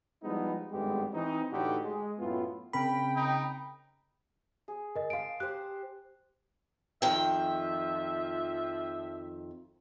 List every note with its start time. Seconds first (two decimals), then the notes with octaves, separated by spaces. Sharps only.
0.24 F3 G3 G#3 B3 D#4 E4
0.72 G#1 G2 G#3 A3 B3 G4
1.13 E3 C4 D#4
1.51 A2 D3 E3 D#4 F#4 G4
1.83 G#3
2.19 F#2 A2 B3 E4 F4
2.73 C#3 C4 A#4 G5 B5
3.16 D#4
4.68 G#4
4.96 A#4 D#5
5.10 F5 A5 C6 D7
5.40 G4 C5 F#6
7.02 F2 D#3 F3 E5 G5